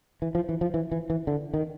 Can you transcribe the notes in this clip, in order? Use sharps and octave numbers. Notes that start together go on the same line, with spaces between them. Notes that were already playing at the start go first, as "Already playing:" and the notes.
E3
F3
E3
F3
E3
E3
E3
D3
D#3